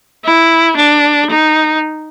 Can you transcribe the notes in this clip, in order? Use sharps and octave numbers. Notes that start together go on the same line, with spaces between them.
E4
D4
D#4